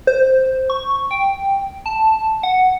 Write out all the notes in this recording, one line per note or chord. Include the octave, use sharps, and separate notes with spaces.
C5
C#6
G5
A5
F#5